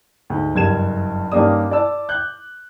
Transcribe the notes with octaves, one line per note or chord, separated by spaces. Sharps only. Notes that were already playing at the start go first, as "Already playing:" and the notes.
D2 G#2
F#1 G2 G#6 E7
G2 D#3 A#3 C#4 D5 D#6
D5 A5 E6
D6 F#6 G6